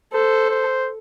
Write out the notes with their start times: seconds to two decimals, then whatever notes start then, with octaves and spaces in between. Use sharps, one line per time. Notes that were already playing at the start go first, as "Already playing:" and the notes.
0.13 A4 C5
0.50 C5